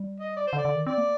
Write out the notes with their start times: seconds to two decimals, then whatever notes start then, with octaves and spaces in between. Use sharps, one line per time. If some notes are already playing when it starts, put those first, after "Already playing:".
Already playing: G3
0.20 D#5
0.36 D5
0.47 C5
0.53 D3
0.58 D5
0.65 D3
0.75 D#3
0.87 C4 D5
0.98 A#3